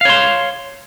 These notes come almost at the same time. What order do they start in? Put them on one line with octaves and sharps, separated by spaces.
F5 C#5 C6